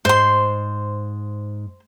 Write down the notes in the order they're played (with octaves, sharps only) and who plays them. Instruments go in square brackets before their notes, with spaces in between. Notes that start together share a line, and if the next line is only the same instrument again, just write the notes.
[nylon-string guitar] G#2 [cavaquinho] C5 C6